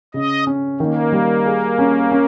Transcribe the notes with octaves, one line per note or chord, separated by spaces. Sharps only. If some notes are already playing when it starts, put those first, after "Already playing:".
C#3 D#5
C#4
D#3 A#3
G3
G#4
C#4
C#4